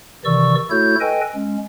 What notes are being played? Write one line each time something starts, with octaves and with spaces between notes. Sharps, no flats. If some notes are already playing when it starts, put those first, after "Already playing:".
C3 D#3 E3 D5 C#6 E6
A3 E4 F#4 A4 C#5 G6
A4 B4 D#5 G5 G#5
G#3 C#4